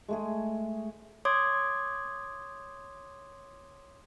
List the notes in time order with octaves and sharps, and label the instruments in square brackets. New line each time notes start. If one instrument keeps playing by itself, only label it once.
[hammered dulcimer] G#3 A3 G#4
[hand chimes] C#5 C6 D6 D#6 G#6